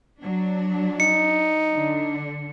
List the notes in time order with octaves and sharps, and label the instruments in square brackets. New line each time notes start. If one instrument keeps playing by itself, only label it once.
[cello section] F#3 D4
[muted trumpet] D#4 [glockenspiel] C#7
[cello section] D3 D4